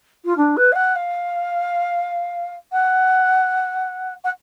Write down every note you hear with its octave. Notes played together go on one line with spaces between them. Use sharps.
F4
D4
B4
F5
F#5
F5
F#5
F#5